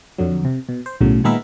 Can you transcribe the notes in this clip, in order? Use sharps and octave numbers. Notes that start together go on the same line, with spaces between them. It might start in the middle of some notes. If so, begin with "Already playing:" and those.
F2 D3 F#3
C3
B2
C5
B1 A2 C#3 F#3
A#2 D#3 G#3 B3 A#4 E5